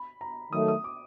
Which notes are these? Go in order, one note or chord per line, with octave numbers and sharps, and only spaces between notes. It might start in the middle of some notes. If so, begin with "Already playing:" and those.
Already playing: B5
A#5
D#3 F#3 A3 D#6
D#6
D6